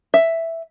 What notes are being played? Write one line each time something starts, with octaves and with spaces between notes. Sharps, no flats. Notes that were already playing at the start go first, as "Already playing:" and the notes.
E5